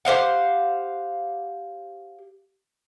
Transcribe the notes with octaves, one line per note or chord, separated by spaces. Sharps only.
G4 C5 F5 F#5